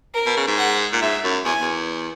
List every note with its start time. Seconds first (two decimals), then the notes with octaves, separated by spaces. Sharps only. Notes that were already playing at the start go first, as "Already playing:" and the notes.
0.14 A#4
0.26 B2
0.37 C#3
0.47 G#2
0.58 F#5
0.93 A#2
1.02 G#2 E5
1.24 F#2
1.45 E2 G#5
1.61 E2